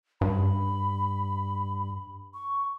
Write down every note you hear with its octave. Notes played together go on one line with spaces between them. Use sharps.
G2 B5
C#6